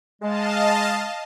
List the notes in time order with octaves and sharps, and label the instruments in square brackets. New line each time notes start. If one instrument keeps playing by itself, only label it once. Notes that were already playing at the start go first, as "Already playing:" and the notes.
[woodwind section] G#3 [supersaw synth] D#5 F5 A5